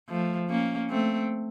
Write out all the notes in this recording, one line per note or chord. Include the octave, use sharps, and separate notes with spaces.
F3 A3
A#3 C#4
A3 C4